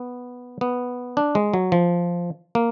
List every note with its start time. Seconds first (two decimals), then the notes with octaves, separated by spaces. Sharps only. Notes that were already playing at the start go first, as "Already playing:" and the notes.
Already playing: B3
0.61 B3
1.17 D4
1.35 G#3
1.54 F#3
1.72 F3
2.55 A#3